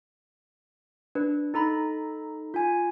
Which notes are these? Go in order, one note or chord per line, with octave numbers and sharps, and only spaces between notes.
D4 B4
D#4 A4 A#5 B5
F4 G#5